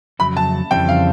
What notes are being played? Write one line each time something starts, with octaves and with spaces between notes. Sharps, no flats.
F2 C#3 F#3 B5
A5
F2 C#3 E3 G3 C4 G5
F5